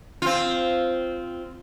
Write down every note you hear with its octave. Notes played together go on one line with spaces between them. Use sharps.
C4 F4